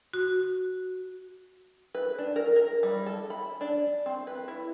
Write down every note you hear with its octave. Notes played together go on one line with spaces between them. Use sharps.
F#4
B4
D4
A#4
A#4
G3
A4
B5
D4
C4
B4
E4